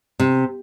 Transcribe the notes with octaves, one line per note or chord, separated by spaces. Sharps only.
C3